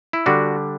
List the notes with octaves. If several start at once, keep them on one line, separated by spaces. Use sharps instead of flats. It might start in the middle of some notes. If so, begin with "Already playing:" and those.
E4
D3 G3 D4 F#4